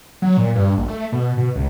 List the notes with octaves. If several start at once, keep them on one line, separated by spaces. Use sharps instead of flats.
F#3
A#2
G2
A#1
A3
B2
B2
C#2